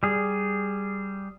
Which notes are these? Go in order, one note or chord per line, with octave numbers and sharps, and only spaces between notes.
G3 G#4